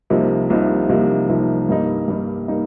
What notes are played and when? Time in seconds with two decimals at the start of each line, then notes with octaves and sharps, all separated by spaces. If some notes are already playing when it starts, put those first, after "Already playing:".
0.10 C2 C3 F3 A#3 D#4
0.50 C2 C3 F3 A#3 D#4
0.89 C2 C3 F3 A#3 D#4
1.29 C2 C3 F3 A#3 D#4
1.68 G2 G3 A#3 D#4
2.08 G2 G3 A#3 D#4
2.48 G3 A#3 D#4